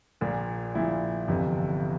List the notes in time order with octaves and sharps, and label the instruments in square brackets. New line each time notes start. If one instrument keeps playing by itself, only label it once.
[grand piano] A#1 A#2 F3
A#1 A#2 F3 E4
G1 F2 C3 E3